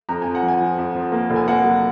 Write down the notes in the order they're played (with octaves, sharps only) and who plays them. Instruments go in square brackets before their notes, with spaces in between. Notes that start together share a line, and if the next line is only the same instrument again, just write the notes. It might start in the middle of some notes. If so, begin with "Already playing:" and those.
[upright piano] F2 A#5
F3 G#5
F#5
F3
G#5
F3
F2
F3
A#3
F1
G#5
A#3 F#5
F#3